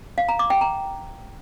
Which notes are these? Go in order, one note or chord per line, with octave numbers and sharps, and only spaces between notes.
F5
A#5
D6
G5
A#5